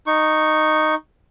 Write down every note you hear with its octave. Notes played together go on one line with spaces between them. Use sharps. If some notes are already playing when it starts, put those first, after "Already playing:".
D#4 C#6